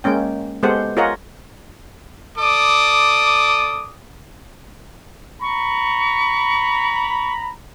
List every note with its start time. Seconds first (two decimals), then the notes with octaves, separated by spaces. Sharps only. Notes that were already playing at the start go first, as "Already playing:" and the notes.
0.04 G#3 A#3 C#4 G5
0.63 G#3 B3 G4 A4 C5 F#5
0.97 F4 G#4 A#4 C#5 D#5 F#5
2.38 A4 D5 D6 D#6
5.41 A#5 B5 C#6